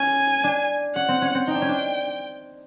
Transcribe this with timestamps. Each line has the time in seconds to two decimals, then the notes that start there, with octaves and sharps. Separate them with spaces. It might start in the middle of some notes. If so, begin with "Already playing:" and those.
Already playing: C#4 G#5
0.44 D4
0.95 C#4 F#5
1.08 C4
1.22 C#4
1.35 C4
1.47 D#4 G5
1.55 D4
1.62 C#4
1.69 D4